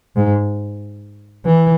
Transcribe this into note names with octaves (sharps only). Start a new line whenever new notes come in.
G#2
E3